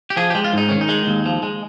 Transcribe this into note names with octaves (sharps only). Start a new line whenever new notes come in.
G4
F3 G#4
G4
G#3
F4
G#2 D#4
D#3 C#4
D#4
G#3
D#2
F3
G#3